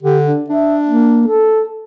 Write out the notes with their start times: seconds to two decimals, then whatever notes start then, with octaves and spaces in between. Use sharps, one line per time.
0.03 D3 G4
0.27 D4
0.50 D4 E5
0.85 A#3
1.27 A4